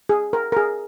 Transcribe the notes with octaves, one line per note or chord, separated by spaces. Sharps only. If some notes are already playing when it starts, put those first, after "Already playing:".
G#4
A#4
A#4
G#4